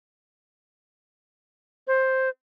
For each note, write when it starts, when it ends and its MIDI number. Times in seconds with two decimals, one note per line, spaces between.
1.88 2.29 72